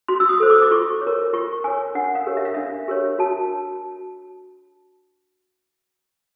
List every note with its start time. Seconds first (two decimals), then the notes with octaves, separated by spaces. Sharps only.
0.08 F#4 C6
0.20 E6
0.29 D#6
0.40 A4 C5
0.50 D6
0.62 D6
0.71 F4 C#6
1.02 C#5
1.07 A#4
1.33 F4 C#6
1.64 A#4 C#5 G#5
1.95 D4 F#5
2.15 F5
2.27 G4 A#4 C#5
2.37 E5
2.45 F5
2.54 D4 E5
2.88 G4 A#4 C#5
3.18 F#4 A5